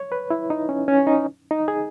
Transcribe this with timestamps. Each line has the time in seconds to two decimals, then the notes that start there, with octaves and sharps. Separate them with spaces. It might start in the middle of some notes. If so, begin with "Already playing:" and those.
Already playing: C#5
0.12 B4
0.30 E4
0.50 D#4
0.69 C#4
0.88 C#4
1.07 D#4
1.51 D#4
1.68 G#4